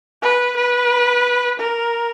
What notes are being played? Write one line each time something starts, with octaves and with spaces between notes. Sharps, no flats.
B4
B4
A#4